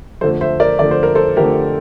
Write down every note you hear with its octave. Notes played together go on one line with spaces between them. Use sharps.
F2 D3 A3 A4 C5
C5 E5
A#4 D5
F2 D3 A3 D5
C5
A#4
A4 C5
F2 D3 A3 G4 A#4